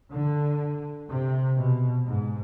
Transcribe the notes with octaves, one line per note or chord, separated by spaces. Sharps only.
D3
C3
B2
G#2